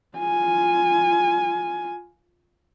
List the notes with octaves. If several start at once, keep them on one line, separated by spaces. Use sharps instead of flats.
F4 G#5